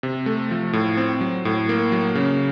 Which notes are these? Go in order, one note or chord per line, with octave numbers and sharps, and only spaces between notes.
C3
A3
F3
A2
C4
F#3
A2
A#3
F#3
C#3